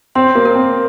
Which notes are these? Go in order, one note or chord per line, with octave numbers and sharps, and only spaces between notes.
C4 C6
A#3
A#4
C4